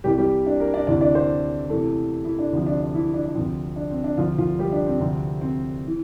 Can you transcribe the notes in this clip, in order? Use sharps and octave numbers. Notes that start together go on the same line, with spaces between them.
C2 C3 E3 G3 G4
G3 G4
D4
A#3 A#4
D4 D5
D2 C3 E3 D4 D5
D4 D5
C4 C5
E2 C3 E3 A3 A4
E3 E4
D4
D2 C3 F3
D4
D4
E3 E4
D4
D4
D2 C3 F3 C4
D4
C4
D4
D2 C3 F3 F4
F3 F4
G3 G4
D4
C4
D2 C3 F3 C4
C4
E3